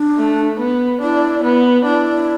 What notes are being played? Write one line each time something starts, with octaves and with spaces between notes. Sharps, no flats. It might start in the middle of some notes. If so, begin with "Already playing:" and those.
Already playing: D4
A3
B3
D4 E4
B3
D4 E4